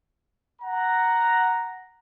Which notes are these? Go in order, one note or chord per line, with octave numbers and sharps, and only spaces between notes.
F#5 A#5